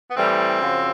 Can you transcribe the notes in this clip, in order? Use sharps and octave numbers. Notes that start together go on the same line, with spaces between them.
B3
A2 E3 G3 C4
F#2 C#3 F3